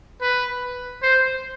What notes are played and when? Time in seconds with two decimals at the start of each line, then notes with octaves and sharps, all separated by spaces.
0.21 B4
1.03 C5